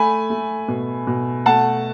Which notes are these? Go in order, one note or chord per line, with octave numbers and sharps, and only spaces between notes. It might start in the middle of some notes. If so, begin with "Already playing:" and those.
Already playing: A3 G#5 B5
A3
B2
B2
A3 F#5 A5